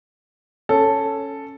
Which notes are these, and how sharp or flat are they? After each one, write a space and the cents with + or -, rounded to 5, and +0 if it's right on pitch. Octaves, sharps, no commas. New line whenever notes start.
C#4 +0 A4 +0